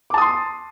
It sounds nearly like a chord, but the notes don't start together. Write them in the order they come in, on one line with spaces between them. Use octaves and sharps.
D6 A5 D#6 C6